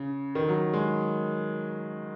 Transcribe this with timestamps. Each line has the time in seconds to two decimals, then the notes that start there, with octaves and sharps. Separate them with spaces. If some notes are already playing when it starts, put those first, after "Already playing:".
Already playing: C#3
0.35 D#3
0.48 F#3
0.73 G#3